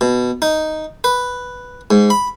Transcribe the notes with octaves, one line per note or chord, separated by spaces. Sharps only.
B2
D#4
B4
G#2
B5